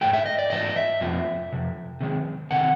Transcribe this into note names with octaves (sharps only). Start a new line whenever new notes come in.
G#2 E3 A3 G5
E5
D#5
D5
G#2 E3 A3 D#5
E5
F2 C3 F3 A#3
F2 C3
C3 D#3 G#3
C3 D#3 F#5